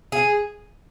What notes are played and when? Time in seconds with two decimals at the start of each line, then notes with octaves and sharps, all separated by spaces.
0.12 G#4